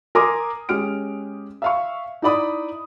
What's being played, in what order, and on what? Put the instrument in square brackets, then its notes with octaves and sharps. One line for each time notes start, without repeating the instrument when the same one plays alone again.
[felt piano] A#4 G#5 A#5 C6 D6 D#6
G#3 C#4 G4 F6 D7
E5 F5 C#6
D#4 E4 D5 B5 D#6